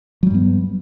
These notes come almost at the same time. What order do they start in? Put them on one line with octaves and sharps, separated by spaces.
F#3 G3 G2 B3